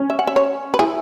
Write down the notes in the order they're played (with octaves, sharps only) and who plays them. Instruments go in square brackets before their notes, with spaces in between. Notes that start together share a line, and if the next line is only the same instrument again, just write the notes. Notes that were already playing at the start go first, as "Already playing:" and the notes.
Already playing: [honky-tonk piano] C#4
[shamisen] E5
F#5
E5
C#5
B4
[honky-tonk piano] E4 [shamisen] G#4